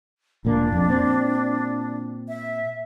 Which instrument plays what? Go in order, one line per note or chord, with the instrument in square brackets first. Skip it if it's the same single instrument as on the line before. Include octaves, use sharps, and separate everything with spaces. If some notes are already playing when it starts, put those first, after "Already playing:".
[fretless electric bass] E1 A#2 A#3 [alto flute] D4
[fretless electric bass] F2
A#2 C4
[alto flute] E5